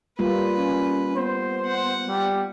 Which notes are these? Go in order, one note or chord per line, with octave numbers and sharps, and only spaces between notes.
G3 A#3 F4 B4
C#4
B3 C5
F#5
G3